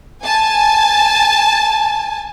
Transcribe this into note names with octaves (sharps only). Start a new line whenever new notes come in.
G#5 A5